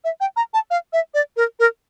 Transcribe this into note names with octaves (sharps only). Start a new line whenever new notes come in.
E5
G5
A#5
A5
F5
E5
D5
A#4
A#4